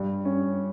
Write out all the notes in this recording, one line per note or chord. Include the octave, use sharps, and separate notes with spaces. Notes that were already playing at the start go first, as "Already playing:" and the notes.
Already playing: G2
C#4